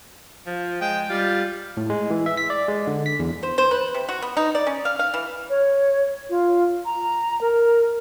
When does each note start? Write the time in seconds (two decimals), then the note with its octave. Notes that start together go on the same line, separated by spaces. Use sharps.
0.46 F3
0.81 G#3 G5
1.09 G3 F4
1.77 A2
1.90 G#3
2.10 E3
2.26 E5
2.37 B6
2.50 D5
2.68 G#3
2.87 D3
3.06 B6
3.19 E2
3.43 C5
3.58 C5
3.71 B4
3.94 C3
4.09 F#4
4.22 B3
4.37 D#4
4.55 D5
4.67 C#4
4.85 F5
4.99 F5
5.14 E3
5.50 C#5
6.30 F4
6.85 A#5
7.41 A#4